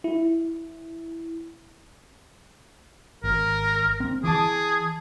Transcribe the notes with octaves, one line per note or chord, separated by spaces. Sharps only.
E4
G#1 A#4
C4
E3 G#4 A5 D6 D#6